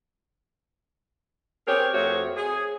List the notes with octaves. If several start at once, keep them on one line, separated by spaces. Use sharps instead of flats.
C4 G4 G#4 A#4 C#5
F2 A3 C4 F#4 C#5
G#4